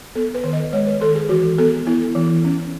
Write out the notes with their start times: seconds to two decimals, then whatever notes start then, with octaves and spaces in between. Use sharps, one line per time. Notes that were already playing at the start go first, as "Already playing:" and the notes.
0.15 B3 A4
0.34 B4
0.44 D#3
0.53 D#5
0.72 G#3 C#5
0.87 B4
1.01 D#3 A4
1.15 G#4
1.29 E3 F#4
1.58 B3 A4
1.87 B3 E4
2.15 E3
2.45 C#4